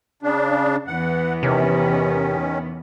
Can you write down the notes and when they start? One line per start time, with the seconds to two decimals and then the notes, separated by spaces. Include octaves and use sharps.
0.23 C#3 D4
0.87 E2 E3 B3 F#5
1.43 C3 D#3 C#4